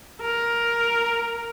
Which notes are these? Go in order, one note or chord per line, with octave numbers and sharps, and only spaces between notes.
A#4